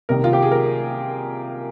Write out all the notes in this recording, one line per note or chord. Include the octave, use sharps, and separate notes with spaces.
C2 C3 D#3 A#4
F4
G4
G#4
A#4